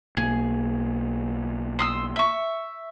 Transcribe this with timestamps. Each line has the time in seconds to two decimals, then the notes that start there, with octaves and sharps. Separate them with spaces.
0.17 B1 A#3 G#4
1.79 C6 D#6 E6
2.16 E5 C#6